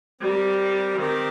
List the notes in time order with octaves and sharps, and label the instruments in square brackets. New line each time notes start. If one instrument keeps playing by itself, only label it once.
[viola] G3 [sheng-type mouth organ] C4 G4 A#4
[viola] D#3 [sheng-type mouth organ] C4 G4 A#4